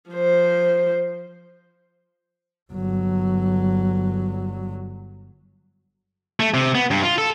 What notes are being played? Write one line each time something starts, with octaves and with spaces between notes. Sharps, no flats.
F3 C5
G1 F#3
A3
C3
B3
G2
F4
A4